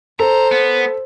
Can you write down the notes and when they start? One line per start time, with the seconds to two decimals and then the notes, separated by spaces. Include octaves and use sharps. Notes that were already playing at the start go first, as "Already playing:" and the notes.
0.20 A4 C5 A#5
0.52 B3